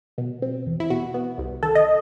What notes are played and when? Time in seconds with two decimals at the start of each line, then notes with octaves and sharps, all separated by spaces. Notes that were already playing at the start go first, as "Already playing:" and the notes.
0.18 B2
0.42 C4
0.66 E2
0.80 E4
0.90 B2 F#4
1.14 B3
1.38 C2
1.63 D#3 A4
1.75 D#5